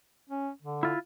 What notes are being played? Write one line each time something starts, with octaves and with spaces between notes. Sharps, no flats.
C#4
D3
E4 F4